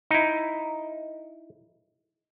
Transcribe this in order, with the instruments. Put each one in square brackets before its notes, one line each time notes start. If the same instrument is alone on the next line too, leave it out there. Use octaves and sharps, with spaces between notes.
[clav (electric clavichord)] D#4 E4